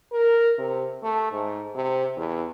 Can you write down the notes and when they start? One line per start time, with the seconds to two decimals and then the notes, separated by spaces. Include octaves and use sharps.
0.12 A#4
0.58 C3
1.03 A3
1.32 G#2
1.75 C3
2.17 E2